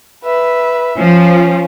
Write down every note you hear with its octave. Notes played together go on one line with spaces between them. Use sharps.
B4 E5
F3 C#4